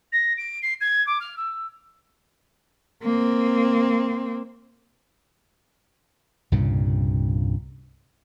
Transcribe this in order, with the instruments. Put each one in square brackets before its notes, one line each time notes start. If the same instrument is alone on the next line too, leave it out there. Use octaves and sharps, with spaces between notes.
[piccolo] A#6
D7
C7
G#6
D6
F6
E6
[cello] A#3 C4
[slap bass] C2 G2 A#2 C#3